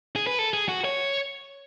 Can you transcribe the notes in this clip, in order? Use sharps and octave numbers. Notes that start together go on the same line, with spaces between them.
G#4
B4
A4
G#4
F#4
C#5